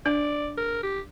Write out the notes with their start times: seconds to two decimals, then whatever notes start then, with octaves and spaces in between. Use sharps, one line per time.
0.06 D4 D5
0.57 A#4
0.83 G4